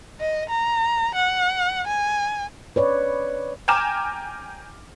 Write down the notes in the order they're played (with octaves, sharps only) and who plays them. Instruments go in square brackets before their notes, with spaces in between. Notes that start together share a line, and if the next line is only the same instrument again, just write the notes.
[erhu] D#5
A#5
F#5
G#5
[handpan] B4 C#5 D5
[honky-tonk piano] G5 G#5 A#5 D6 F6 E7